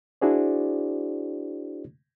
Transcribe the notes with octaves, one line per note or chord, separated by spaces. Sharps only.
D4 E4 F#4 G#4 C5 D5